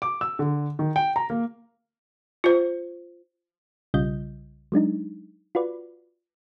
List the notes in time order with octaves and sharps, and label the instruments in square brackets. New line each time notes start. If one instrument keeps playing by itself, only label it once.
[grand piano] D6
E6
D3
D#3
G5
A#5
A#3
[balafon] F4 C5
[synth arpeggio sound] B1 C#3 G3 F4 D#5 G6
F#3 G#3 D4 D#4
F4 F#4 B4 D5